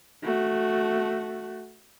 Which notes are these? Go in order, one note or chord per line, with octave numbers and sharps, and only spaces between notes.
A3 F#4